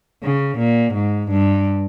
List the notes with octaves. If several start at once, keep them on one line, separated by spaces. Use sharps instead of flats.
C#3
A#2
G#2
G2